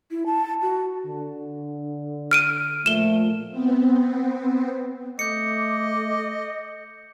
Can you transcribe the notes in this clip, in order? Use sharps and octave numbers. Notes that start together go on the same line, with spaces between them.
E4
A5
F#4
D3
F6 D7 D#7
A#2 F3 A3 E7 G7
B3 C4
A3 D#5 D6 G6 C#7